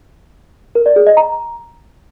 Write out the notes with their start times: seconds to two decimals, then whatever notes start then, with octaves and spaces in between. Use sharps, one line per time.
0.75 A#4
0.86 D5
0.96 G#4
1.07 D#5
1.17 A#5